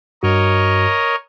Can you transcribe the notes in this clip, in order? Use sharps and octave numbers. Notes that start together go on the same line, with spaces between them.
G2 F#4 A#4 C#5 D#5